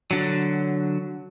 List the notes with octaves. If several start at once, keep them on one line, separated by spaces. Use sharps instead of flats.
D3 F#3